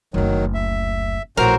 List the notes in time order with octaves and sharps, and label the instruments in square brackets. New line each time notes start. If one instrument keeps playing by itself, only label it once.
[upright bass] F#1 D2 [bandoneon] D#3 F#3
[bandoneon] E5
[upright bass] A#1 [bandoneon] A2 F#4 C5 [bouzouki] A#4